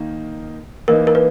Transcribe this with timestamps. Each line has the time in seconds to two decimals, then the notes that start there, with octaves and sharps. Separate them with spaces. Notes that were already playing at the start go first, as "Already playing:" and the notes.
Already playing: D#3 A#3 D#4
0.88 E3 A#3 D#4 A#4
1.07 A#4
1.15 B4